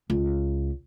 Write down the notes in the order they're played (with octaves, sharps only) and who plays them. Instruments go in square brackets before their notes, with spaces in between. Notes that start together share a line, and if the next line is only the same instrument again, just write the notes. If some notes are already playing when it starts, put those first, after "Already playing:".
[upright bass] C#2